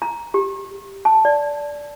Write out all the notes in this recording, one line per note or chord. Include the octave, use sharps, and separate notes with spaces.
A#5
G4
A5
D5